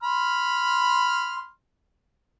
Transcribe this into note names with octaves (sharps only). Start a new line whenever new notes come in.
B5 C6 F6